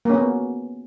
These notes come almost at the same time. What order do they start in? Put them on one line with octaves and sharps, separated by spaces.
A#3 C#4 B3